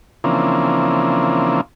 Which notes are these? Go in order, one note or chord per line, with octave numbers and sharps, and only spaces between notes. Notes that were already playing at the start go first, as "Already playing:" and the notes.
C#3 E3 F3 A#3 C4 D4